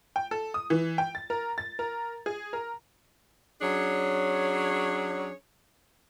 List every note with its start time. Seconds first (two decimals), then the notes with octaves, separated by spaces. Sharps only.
0.16 G5
0.31 A4
0.54 D#6
0.70 E3
0.98 G5
1.15 A6
1.30 A#4
1.58 A6
1.79 A#4
2.26 G#4
2.53 A#4
3.61 F#3 C#4 D4 G#4 C#5